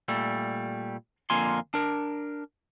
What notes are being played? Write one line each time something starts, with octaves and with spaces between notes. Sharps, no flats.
A#2 G3 A3
F2 D3 A#3 F4 G#5 C6
D4 A#4